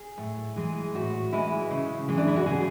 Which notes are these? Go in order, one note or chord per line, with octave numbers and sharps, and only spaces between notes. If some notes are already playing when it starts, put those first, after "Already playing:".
Already playing: G#4
A2
E3 G#3
A2 F#4
E3 G#3 E4
C#3
E3 G#3
D4
E4
F#4
C#3 G#4